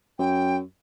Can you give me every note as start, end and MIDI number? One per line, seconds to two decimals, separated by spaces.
0.19 0.61 42
0.19 0.57 79